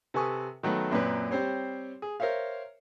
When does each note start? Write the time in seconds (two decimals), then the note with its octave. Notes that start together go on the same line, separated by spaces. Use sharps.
0.14 C3 A4 B4 G#5 C#6 D#6
0.63 D#3 F#3 A3 B3
0.92 F#2 A#2 C4 B4 C#5
1.31 G3 C4 C5 C#5
2.02 G#4
2.20 A#4 C5 C#5 E5 F5